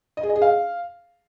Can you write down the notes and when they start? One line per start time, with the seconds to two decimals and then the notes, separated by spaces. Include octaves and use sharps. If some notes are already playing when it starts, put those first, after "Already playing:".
0.17 D#5
0.23 G#4
0.29 D#5
0.36 G#4
0.42 F5